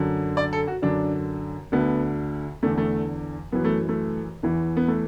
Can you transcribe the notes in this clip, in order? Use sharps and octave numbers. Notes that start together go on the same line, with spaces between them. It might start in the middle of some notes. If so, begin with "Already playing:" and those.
Already playing: F#2 D3
D5
A4
F#4
F#2 D3 D4
D2 D3 B3
E2 D3 A3
A3
F#2 E3 B3
A3
A3
E2 E3
B3
A3